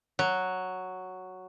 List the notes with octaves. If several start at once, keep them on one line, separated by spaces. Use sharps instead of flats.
F#3